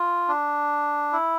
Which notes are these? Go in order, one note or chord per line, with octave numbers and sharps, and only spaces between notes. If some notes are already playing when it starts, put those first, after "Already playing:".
Already playing: F4
D4
E4